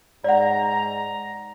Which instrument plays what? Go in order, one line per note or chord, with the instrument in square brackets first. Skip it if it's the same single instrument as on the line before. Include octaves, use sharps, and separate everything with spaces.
[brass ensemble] G#2 A#5 [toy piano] D5 F#5